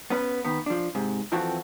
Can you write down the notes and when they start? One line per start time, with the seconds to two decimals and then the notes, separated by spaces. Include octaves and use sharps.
0.10 B3 C#4 B4
0.45 D#3 B3
0.66 F3 D4
0.95 G#2 C3
1.32 F2 E3 F3 C4 F#4 A4